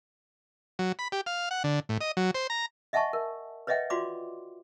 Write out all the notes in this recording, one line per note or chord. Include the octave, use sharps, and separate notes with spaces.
F#3
B5
G4
F5
F#5
D3
A2
D#5
F#3
C5
A#5
D#5 E5 F#5 G#5 A5 C#6
A#4
B4 C#5 D#5 E5 F#5 G5
F4 F#4 D5 B5 C6 D6